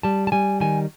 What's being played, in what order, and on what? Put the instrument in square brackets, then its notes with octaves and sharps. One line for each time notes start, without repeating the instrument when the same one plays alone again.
[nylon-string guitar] G3 A5
A5
G3 G#5
D#3 G#5